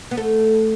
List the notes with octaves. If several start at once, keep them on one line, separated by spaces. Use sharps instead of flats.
B3
A3